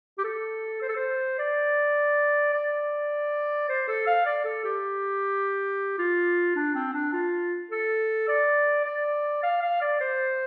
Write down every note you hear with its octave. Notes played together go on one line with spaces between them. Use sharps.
G4
A4
C5
A4
C5
D5
D5
C5
A4
F5
D5
A4
G4
F4
D4
C4
D4
F4
A4
D5
D5
F5
F5
D5
C5